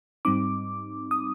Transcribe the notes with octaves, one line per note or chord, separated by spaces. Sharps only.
G#2 G3 C4 D#4 D6
D#6